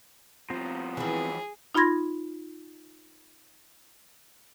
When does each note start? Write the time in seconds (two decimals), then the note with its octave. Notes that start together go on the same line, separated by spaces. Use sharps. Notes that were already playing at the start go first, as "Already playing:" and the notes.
0.50 F3 G3 B3 C4 A#5
0.97 D#3 E3 G#4
1.75 D#4 F4 B5 C6 G#6 A#6